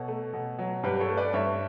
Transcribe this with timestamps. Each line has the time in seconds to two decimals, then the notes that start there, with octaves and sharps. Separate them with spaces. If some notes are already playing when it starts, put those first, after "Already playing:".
Already playing: B2 A4 C#5
0.08 A3
0.33 B2
0.59 F#3
0.83 G2 G4 B4
1.00 A4 C#5
1.09 A3
1.17 B4 D5
1.33 G2 C#5 E5